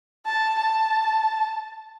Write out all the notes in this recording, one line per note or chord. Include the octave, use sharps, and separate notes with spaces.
A5
A5